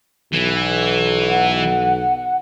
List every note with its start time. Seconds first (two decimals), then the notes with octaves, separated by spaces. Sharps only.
0.33 B1 E3
1.29 F#5